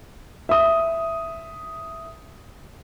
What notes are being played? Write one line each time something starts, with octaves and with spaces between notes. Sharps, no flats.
E5 D#6